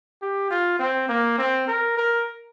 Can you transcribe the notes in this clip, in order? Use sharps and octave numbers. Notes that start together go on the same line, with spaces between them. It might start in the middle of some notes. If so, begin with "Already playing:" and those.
G4
F4
C4
A#3
C4
A#4
A#4